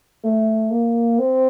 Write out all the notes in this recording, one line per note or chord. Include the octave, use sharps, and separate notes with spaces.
A3
A#3
C4